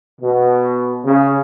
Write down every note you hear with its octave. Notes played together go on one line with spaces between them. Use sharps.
B2
C#3